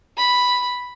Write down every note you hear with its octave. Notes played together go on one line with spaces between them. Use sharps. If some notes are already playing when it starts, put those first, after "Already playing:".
B5